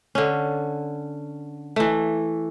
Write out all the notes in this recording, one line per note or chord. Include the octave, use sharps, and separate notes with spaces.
D3 C#4
E3 A3